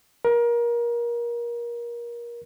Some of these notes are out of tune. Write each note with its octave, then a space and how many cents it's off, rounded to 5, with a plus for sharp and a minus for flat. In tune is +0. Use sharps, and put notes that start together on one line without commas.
A#4 +25